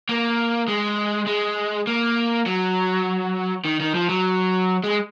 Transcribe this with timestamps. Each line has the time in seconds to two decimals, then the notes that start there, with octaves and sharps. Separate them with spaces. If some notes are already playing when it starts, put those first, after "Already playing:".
0.09 A#3
0.68 G#3
1.27 G#3
1.87 A#3
2.46 F#3
3.65 D#3
3.80 D#3
3.95 F3
4.09 F#3
4.84 G#3